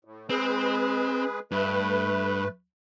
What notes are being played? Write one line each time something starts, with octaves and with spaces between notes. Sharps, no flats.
A2
G#3 C4 G#4 B4
G2 A3 B4